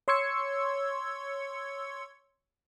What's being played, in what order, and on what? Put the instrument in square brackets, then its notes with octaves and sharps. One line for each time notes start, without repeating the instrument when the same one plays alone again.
[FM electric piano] C#5 C6 C#6 E6 G#6 C#7